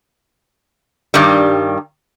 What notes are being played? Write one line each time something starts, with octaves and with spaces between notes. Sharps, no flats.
G2 D#3 G3